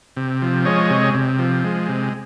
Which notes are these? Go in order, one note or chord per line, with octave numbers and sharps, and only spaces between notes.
C3
F3
G#3 C#5 D#5
C3
C3
F3
G#3
C3